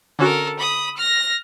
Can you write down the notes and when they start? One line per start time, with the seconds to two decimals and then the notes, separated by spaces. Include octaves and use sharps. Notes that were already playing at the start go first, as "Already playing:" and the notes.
0.19 D3 C#4 F#4 A4 A#4
0.59 B5 D#6
0.97 F6 A#6